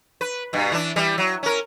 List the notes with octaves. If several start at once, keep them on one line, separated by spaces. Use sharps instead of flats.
B4
G2 B2
E3 D4
E3 G3
F#3
C#4 A#4